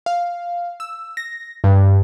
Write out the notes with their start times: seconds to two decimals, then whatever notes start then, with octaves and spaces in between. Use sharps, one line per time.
0.06 F5
0.80 E6
1.17 A#6
1.64 G2